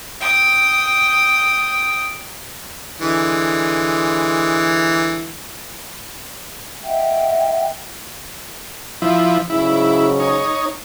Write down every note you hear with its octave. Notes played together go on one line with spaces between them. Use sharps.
G5 D#6
D3 E3 G#3
D#5 E5 F#5 G5
F3 E4
G#2 C#3 F#3 E4
D#4 C#5